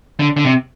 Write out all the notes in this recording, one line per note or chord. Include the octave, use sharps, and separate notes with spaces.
D3
D3
C3